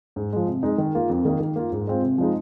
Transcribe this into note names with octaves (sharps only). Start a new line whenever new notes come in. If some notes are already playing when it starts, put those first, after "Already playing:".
G#2
F3 G#3
C3
G#3 D#4
D#3
A#3 F4
F2
D#3 A#3 D#4
D#3
A#3 F4
G#2
G#3 C4 F4
C3
F3 G#3 D#4